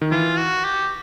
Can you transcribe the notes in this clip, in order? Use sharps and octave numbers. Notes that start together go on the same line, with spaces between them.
D#3
E3 F4
F#4
G4